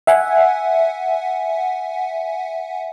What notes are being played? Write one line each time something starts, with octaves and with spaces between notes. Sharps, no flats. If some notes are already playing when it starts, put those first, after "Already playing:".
E5 F#5 G#5